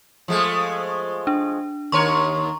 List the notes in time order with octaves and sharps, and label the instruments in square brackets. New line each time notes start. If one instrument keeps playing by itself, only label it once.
[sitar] F3 G#3 A3
[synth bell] D4
[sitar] D#2 A#4 C#5 [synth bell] A#5 C6 C#6